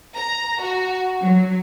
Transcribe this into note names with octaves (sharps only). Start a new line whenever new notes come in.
A#5
F#4
F#3